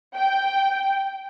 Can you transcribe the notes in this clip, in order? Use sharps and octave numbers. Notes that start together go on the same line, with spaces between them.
G5